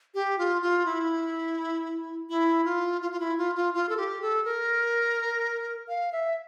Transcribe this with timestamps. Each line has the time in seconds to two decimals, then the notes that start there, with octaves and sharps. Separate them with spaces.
0.14 G4
0.38 F4
0.62 F4
0.86 E4
2.29 E4
2.65 F4
3.02 F4
3.12 F4
3.20 E4
3.38 F4
3.55 F4
3.74 F4
3.89 A4
3.97 G4
4.22 A4
4.45 A#4
5.88 F5
6.12 E5